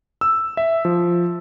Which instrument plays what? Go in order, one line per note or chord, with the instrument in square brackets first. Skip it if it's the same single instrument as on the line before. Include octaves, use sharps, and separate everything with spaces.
[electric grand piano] E6
E5
F3